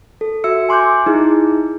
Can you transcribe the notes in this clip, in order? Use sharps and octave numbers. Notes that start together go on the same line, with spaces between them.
A4
F#4 E5 E6 C#7
G#5 C6 D6 F#6 G6
D#4 E4 G#4